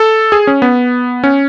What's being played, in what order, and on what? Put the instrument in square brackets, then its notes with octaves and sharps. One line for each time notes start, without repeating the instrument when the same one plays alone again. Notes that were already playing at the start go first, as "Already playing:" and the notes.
Already playing: [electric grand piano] A4
G#4
C#4
B3
C#4